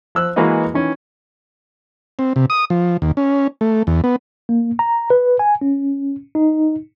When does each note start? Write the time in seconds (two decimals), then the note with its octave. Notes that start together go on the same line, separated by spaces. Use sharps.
0.15 F3 E6 F#6
0.36 E3 G#3 A#3 F#4 B4 D#5
0.74 D#3 E3 C#4
2.19 C4
2.36 C3
2.50 D#6
2.70 F3
3.02 D#2
3.17 C#4
3.61 A3
3.87 E2
4.04 B3
4.49 A#3
4.79 A#5
5.10 B4
5.39 G#5
5.62 C#4
6.35 D#4